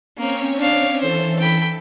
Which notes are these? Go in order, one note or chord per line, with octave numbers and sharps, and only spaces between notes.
A#3 C4 C#4 C#5
D4 F5
E3 A4 C5
G5 B5